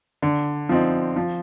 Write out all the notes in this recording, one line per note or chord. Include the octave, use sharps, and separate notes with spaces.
D3
F3 C4 D#4
F3